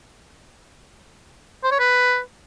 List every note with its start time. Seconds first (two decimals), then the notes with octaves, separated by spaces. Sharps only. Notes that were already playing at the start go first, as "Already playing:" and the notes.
1.64 C5
1.72 C#5
1.80 B4